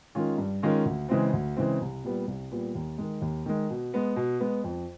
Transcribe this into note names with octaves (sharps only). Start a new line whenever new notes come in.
D#3 G#3 C#4 F4
G2
D#3 G#3 C#4 F4
D2
C#3 E3 G#3 C4
D2
C#3 E3 G#3 C4
C2
A#2 G3 B3
C2
A#2 G3 B3
D#2
D#3 G#3
D#2
D#3 G#3
B2
G#3 B3
B2
G#3 B3
F2